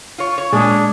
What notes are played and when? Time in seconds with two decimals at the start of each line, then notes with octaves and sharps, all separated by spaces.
0.18 F4 C#5
0.38 C#5
0.53 A#2 G#3 D4 G#4